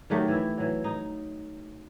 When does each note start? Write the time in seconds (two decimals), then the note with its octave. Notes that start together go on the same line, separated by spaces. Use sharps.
0.10 D#3 F#3 A3 G4
0.28 E3 E4
0.57 E3 F#3
0.84 D#4